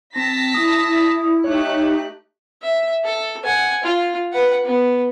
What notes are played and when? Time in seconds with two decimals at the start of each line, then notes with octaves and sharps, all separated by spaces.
0.16 C4 A5 A#6 B6
0.55 E4 D#6
1.44 A3 D#4 G4 C#5 F#6
2.62 E5
3.04 A4
3.44 F#5 G#5
3.84 F4
4.33 B4 F#5
4.65 B3